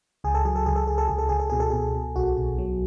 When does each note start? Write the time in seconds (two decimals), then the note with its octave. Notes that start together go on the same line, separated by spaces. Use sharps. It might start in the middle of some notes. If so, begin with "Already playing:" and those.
0.24 C#2 G#4
0.35 A4
0.45 F#3 G#4
0.56 A4
0.66 C#2 G#4
0.76 A4
0.87 C#2 G#4
0.98 A4
1.08 C#2 G#4
1.18 A4
1.29 C#2 G#4
1.40 A4
1.50 B2 G#4
1.60 A4
1.70 B2 G#4
1.95 B2
2.16 B1 F#4
2.37 B2
2.58 F#3